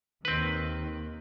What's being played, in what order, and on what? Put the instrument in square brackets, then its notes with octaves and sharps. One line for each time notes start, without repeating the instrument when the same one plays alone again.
[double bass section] D#2 D#3 [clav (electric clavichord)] C4 B4